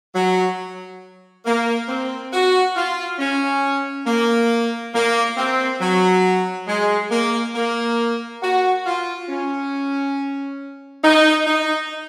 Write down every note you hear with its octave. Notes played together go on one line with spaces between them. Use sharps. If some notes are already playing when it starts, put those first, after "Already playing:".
F#3
A#3
C4
F#4
F4
C#4
A#3
A#3
C4
F#3
G#3
A#3
A#3
F#4
F4
C#4
D#4
D#4